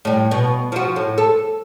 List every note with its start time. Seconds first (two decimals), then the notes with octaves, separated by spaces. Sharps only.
0.05 A2 G3
0.31 B2
0.72 F3 F#4
0.96 A2
1.18 A4